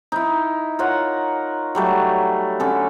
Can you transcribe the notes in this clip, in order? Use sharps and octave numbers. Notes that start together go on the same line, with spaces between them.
D#4 E4
F4 A#4 C#5 F#5
F#3 G3 A3
D3 C#4 A4